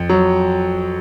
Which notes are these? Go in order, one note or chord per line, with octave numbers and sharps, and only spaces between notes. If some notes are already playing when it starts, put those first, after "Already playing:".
Already playing: F2
F#3